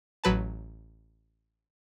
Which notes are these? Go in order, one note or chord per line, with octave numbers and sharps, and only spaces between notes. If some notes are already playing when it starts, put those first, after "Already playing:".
A1 F#3 B4 A5